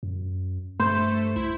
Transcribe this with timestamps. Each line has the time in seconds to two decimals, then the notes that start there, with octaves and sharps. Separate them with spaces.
0.03 F#2
0.80 G2 A3 C5
1.36 C2 E4